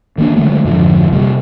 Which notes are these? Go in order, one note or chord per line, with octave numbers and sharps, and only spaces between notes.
D#3 A#3 D4
D3 F#3 G#3 A3
F2 G#2 D3 F3
C3 G3 A#3